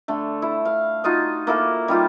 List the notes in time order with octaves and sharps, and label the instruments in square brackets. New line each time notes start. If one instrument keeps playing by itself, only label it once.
[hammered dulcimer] D3 A3
E4
F5
D#4 F4 F#4 D#5
A#3 E4 A4
G3 D#4 F4 G4